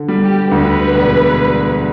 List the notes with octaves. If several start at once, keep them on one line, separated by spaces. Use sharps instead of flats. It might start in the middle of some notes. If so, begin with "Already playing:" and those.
Already playing: D3
G3
G4
D2 B4
E1